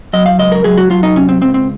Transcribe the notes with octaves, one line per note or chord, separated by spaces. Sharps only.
F#3 D#5
F5
C#2 D#5
A#4
F#3 G#4
F#4
F#3 F4
D#4
C3 C#4
C4
C#2 C4
C4